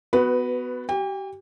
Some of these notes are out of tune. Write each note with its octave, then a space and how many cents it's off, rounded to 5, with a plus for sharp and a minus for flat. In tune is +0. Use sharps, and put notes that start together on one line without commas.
B3 +20 F#4 +5 B4 +0
G4 -35 G5 +40